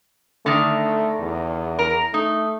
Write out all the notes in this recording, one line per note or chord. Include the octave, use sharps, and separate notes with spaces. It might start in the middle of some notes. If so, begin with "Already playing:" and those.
D3 D#3 A3
E2
A#4
A3 D#4